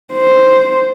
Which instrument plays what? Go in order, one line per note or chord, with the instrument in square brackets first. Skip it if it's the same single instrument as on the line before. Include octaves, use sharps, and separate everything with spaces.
[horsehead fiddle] C5